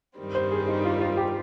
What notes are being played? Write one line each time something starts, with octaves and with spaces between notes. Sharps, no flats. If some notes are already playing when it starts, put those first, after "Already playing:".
G2 D#3 G3 C4
C5
G#4
D#4
F4
F4
G4